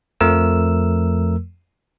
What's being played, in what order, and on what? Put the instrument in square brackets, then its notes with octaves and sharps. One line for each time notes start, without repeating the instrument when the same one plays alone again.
[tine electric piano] F2 F3 A3 A#4 E6